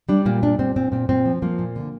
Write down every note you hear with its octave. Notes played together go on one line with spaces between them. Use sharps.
G3 D4
A#2 A#3
G3 D4
A#2 C4
A#2 C4
A#2 C4
A#2 C4
F3
F3 A#3
A#2
D3